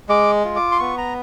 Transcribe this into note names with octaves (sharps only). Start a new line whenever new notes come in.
G#3 D6
F4
D6
C6
B3 C#6
A#5